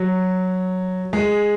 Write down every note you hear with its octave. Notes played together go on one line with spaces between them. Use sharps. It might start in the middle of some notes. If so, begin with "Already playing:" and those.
Already playing: F#3
G#3